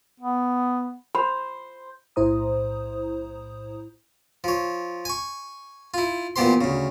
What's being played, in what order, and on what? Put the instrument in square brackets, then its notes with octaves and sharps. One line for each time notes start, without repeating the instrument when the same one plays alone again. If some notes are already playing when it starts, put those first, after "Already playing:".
[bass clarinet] B3
[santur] C5 [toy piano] B5
[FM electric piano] B1 A2 E4 C5 A#5 D#6
[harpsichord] F3 C#5
G#5 C#6
E4 F4
A#2 E3 B3 G4 C5 C6
D2 C#3